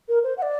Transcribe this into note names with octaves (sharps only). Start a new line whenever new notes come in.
A#4
C5
F#5
D5